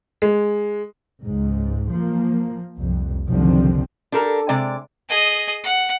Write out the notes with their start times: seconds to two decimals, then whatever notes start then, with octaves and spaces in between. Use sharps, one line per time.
0.22 G#3
1.24 C#2 G#2
1.92 F3 A#3
2.76 C2 F2
3.28 F#1 C2 D3 D#3 F3 C4
4.12 D4 G4 A4 A#4
4.49 C3 G#3 D5
5.09 G#4 D#5
5.64 F#5